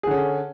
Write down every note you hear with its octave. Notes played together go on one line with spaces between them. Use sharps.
D3 C#4 G#4